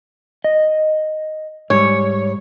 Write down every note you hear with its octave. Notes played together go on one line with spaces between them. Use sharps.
D#5
G#2 G3 C#5